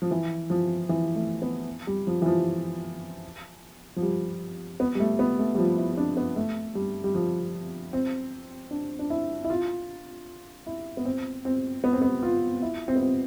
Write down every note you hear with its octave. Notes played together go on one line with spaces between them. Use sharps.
F3
E3
F3
E3
A3
B3
G3
F3
E3
F3
F3
G3
B3
G3
A3
B3
A3
G3
F3
E4
C4
D4
B3
A3
G3
G3
F3
C4
D4
D4
E4
E4
F4
E4
B3
C4
C4
B3
C4
B3
F4
E4
C4
B3
C4